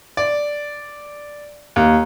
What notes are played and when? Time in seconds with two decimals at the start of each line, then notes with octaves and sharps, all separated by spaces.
0.17 D5
1.76 D#2